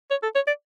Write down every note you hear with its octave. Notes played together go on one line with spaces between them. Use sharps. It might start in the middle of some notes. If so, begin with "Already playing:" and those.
C#5
A4
C#5
D5